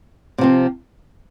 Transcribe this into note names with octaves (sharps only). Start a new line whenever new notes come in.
C3 F3 C4